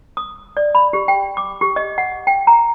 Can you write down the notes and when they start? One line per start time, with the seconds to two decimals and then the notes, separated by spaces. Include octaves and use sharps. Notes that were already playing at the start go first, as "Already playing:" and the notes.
0.17 D#6
0.57 D5
0.75 B5
0.93 G4
1.08 G5
1.37 D6
1.61 G4
1.76 D#5
1.98 F#5
2.27 G5
2.47 A#5